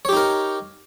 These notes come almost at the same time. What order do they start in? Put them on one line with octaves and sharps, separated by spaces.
C#5 G4 D#4 A#4